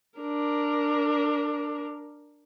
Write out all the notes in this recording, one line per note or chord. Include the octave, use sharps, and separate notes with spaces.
D4 A#4